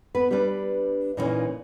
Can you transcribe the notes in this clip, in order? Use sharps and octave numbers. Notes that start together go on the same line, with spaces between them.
B3 B4
G3 D4 B4 D5
A#2 C#3 E3 B3 C#4 D#4